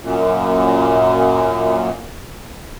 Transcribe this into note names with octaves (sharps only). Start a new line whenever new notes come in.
F#2 A#2